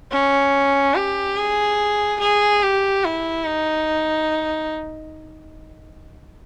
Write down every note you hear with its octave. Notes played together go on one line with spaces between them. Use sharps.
C#4
G4
G#4
G#4
G4
E4
D#4